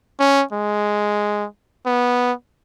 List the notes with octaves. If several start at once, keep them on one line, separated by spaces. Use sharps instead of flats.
C#4
G#3
B3